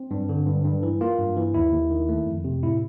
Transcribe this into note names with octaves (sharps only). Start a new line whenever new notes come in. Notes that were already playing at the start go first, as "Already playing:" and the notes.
Already playing: C4
G2
D3
G2
G2
E3
A#3 F4
G2
E3
D#2 E4
D#2
D#3
A3
F2
C3
A2 E4